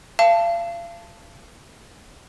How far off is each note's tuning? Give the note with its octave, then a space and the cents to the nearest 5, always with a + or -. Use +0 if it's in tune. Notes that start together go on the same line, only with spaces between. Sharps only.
F5 -35 A5 +0